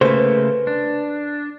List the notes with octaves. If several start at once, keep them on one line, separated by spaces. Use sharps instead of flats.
C#3 A3 A#3 B4 C5
D4